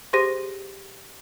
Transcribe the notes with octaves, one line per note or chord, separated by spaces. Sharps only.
G4 G#4 C5 C6 A#6 D#7